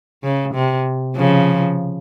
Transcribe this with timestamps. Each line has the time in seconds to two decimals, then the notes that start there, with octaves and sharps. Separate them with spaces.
0.23 C#3
0.54 C3
1.16 C#3 F3